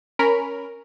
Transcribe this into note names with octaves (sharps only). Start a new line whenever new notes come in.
C#4 A#4 B5